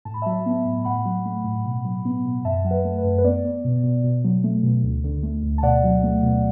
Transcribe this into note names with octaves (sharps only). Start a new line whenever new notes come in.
A2 A5
B5
F#3 E5 A5
B3
A2
A2 F#5 B5
F#3
A3
A2
B2
F#3
B3
B2
F#2 E5 A5
F#3 F#5
B4 E5
A3
B4
F#2
B4
B3 D5
B3
B2
B2
B2
F#3
A3
B2
D2
D3
A3
D2
A5
B2 D5 F#5
F#3
A3
B2